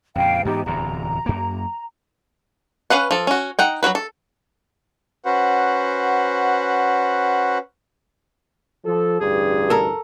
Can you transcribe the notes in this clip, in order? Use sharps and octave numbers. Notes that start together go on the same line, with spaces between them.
F2 A#2 C#3 F5 G5
G#2 E3 B3 D#4 G4
D1 E2 C3 A#5
F#2 A#3
C#4 B4 F5 F#5
F3 A4
C#4 F#4
D#4 F#5 G5
F#3 C4 F#4 B4
A4
C#4 F#4 B4 C5 F#5
F3 A4
A1 D2 G2 G#4
A4 A#4